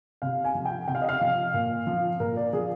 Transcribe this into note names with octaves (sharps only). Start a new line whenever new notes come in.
C3 F5
G#5
F3
G5
C3 G5
F5
D#5
F5
F3
A#2
F3
A#2 A#4
D5
F3 G#4